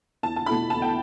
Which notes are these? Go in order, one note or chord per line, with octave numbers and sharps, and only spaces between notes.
E2 A5
A5
B2 A3 E4 B5
E2 A5
G5